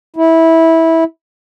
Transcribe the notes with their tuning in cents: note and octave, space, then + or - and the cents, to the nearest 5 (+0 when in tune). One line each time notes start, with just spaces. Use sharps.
E4 -15